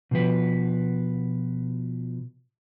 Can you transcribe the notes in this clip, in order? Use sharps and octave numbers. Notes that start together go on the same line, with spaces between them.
B2 F3 B4